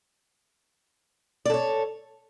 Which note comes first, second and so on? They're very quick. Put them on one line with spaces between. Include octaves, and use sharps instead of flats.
D5 A4 C#5